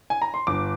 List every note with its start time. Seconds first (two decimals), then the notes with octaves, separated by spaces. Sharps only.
0.10 G#5
0.22 A#5
0.34 C6
0.47 G1 D6